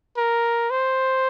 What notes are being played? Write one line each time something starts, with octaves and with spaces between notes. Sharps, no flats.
A#4
C5